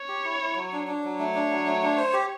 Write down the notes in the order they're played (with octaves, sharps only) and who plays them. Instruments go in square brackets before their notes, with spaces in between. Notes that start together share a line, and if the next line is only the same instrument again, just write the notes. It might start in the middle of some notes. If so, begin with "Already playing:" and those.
Already playing: [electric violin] C#5
[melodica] G4
E4
E4
F#3
D4
D4
F#3
[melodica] A3 [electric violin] C#5
[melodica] D4
F#3
A3
D4
C5
G4